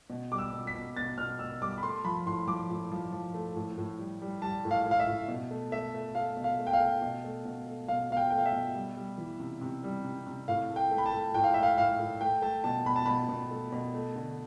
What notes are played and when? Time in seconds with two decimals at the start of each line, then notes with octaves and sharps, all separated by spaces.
0.10 B2
0.32 G3 D6
0.38 E6
0.53 B2
0.67 B6
0.75 B2
0.97 B2 A6
1.18 B2 F6
1.39 B2 E6
1.61 G3 D6
1.78 B5
1.83 A3 C6
2.05 F3 B5
2.26 A2 C6
2.48 F3 D6
2.70 A2
2.91 F3
3.12 F3
3.34 A3
3.56 A2
3.78 A2
3.99 G3
4.22 G3
4.42 G3 A5
4.65 A2
4.71 F5
4.86 A2
4.91 F5
5.00 E5
5.07 A2
5.28 B2
5.51 A3
5.72 A3 E5
5.94 A3
6.15 A3 F5
6.37 B2
6.44 F5
6.59 A3
6.67 G5
6.73 F5
6.81 A3
7.02 B2
7.24 A3
7.45 B2
7.67 A3
7.88 B2 F5
8.10 B2 F5
8.17 G5
8.30 A3 G5
8.38 F5
8.46 E5
8.53 B2
8.75 G3
8.97 G3
9.18 E3
9.40 C3
9.61 C3
9.84 G3
10.05 C3
10.27 C3
10.48 A2 F5
10.70 A3
10.76 G5
10.91 A3
10.98 B5
11.06 A5
11.13 A3
11.34 A2 G5
11.44 F5
11.54 A3 E5
11.63 F5
11.77 A2 F5
11.99 A2
12.21 A3 G5
12.42 A3 A5
12.64 B2 A5
12.85 B2 B5
12.96 A5
13.06 B2 B5
13.29 B2
13.51 A3
13.72 B2
13.94 A3
14.15 D3